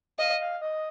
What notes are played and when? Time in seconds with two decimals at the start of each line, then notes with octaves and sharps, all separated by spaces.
0.19 D#5 F5
0.40 F5
0.62 D#5